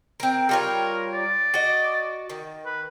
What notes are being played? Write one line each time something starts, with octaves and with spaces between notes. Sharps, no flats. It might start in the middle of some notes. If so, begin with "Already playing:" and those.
C4 A#4
G3 F4 A#4 C#5
D5
F#4 D#5
D#3
B4